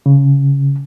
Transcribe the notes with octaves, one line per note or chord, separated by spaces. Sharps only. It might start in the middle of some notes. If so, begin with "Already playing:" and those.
C#3